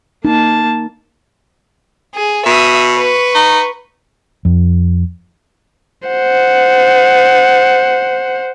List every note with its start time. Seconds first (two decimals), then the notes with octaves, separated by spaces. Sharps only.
0.25 A#3 D#4 A5
2.15 G#4
2.46 B2 E5 D#6
2.95 B4 C#6
3.35 D#4
4.45 F2
6.08 C5 F#5